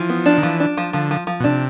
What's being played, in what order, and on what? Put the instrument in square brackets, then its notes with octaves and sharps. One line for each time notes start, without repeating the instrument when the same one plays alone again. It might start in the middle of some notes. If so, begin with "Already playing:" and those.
Already playing: [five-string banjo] E3 [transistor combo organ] F3
[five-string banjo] B3
D4
[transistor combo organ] D#3
[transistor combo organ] E3 [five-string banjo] F3
[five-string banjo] D4
F3
[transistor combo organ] D3 [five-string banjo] F3
[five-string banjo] F3
F3
[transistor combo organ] B2
[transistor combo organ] C3 [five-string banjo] D4